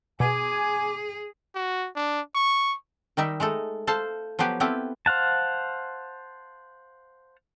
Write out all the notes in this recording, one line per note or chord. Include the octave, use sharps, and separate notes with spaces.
B2 G#4 G#5 D6
F#4
D4
C#6
D#3 G3 D#4 E5
G#3 A3 D#4 A4
A4 C5 F5 A5
F3 F#3 B3 G4 B4
B3 C4 E4 F4 G4 A4
C5 F5 F#5 A5